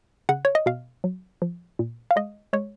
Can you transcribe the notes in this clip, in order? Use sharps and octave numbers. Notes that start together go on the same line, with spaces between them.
C#3 F#5
C#5
D#5
B2 F5
F#3
F3
A#2
F5
G#3 D#5
G#3 C#5